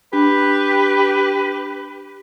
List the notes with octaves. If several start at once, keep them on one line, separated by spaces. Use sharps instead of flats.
D4 G4 B4